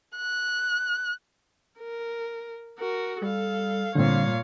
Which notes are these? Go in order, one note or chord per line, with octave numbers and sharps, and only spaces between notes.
F#6
A#4
F#4 A#4
G3 A4 F5
A#2 D3 G3 C4 C#5 F5